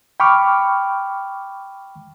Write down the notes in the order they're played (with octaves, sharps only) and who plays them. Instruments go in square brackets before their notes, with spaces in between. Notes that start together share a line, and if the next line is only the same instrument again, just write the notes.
[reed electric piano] G5 B5 C#6 D6 F6